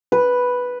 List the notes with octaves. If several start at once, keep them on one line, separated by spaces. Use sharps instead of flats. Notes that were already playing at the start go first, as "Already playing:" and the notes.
B4